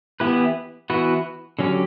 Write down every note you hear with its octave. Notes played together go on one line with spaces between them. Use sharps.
E3 B3 E4 G4 B4
E3 B3 F#4 B4
D3 F#3 C#4 G4